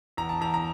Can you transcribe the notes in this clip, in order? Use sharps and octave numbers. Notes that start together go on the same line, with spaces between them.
E2 A#5
A5
E2 A#5
A#5